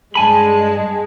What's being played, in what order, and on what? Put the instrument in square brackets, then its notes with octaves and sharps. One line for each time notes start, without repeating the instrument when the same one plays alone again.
[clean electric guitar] G2 G#5 B5 [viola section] G#3 [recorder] A5